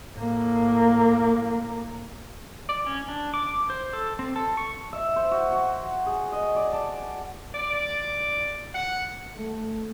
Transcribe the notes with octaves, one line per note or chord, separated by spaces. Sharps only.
A2 A#3
D5
C#4
D4
D6
C5
A4
C4
A4
C#6
E5
C5
F#4
F#4
G#4
D#5
D5
A5
D5
F#5
A3